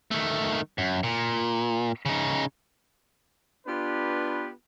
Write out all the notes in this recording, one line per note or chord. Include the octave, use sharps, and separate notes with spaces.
D#3 A3
F#2
A#2
C#3 D#4
B3 D4 F4 G4 B4